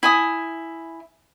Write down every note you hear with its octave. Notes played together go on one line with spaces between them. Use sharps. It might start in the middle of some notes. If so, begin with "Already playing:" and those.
E4 G#5 D#6